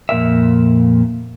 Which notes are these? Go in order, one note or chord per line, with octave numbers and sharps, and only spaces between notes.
F2 A#2 A#4 E5